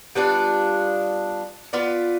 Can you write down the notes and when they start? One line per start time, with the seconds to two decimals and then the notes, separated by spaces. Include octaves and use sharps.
0.15 G3 B3 D4 F4
1.73 B3 F4 B4 D5